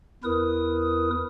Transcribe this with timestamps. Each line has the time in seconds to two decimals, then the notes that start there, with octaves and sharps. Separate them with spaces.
0.24 E2 E4 A#4 B4 D#6